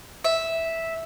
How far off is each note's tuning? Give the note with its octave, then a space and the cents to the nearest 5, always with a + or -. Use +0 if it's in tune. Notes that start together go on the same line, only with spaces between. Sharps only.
E5 -5